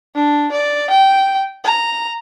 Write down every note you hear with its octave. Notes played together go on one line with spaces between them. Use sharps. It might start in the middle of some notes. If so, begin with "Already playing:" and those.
D4
D5
G5
A#5